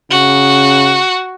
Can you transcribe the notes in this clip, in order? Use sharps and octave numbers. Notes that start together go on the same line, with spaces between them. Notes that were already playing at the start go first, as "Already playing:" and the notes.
C#3 F#4